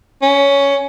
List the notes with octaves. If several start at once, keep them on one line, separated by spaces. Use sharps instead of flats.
C#4